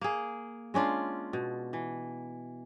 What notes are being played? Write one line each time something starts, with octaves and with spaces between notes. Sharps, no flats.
A#3 G#4
G#3 C#4 D4 F4
B2
E3